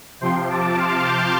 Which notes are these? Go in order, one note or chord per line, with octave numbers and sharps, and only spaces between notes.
C3 F3 G5 C6
A5 D6
C6 F6
D6 G6